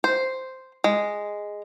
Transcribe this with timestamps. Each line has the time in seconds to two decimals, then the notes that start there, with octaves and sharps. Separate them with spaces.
0.04 C5
0.84 G#3